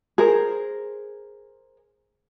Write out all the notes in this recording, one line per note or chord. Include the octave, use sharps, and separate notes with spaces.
G#4 A#4 C5